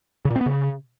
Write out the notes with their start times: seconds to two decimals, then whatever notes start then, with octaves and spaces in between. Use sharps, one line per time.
0.25 C#3
0.30 A#2
0.36 C4
0.41 B3
0.46 C#3